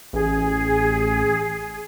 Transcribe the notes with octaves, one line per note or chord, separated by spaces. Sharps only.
A1 G#4